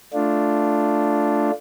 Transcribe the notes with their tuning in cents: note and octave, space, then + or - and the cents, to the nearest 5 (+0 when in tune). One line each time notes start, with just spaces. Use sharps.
A3 +0 D4 +0 F4 +0